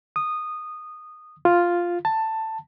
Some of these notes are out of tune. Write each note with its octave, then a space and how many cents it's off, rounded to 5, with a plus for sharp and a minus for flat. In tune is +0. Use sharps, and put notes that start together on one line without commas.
D#6 -15
F4 +0
A5 +10